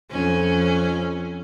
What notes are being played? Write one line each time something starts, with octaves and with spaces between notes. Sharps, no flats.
F2 C#4